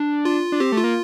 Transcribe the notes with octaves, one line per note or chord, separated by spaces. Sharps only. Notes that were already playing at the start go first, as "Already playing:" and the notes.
Already playing: D4
F4
D4
C4 G4
A3
F4
A#3